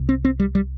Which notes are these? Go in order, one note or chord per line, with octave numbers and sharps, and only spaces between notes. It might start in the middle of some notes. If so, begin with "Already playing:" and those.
Already playing: C2 C3
C4
C4
G3
G3